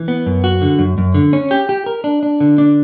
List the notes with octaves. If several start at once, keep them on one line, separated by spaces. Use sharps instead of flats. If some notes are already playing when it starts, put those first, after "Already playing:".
Already playing: E3
B3
F#2
F#4
D3
F#2
F#2
D3
C#4
G4
G4
A#4
D4
D4
D3
D4